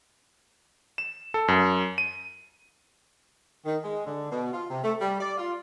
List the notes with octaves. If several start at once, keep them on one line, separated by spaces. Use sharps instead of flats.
E7
A4
F#2
D#7
D#3
G#3
D3
B2
F4
C3
A3
G3
D5
F4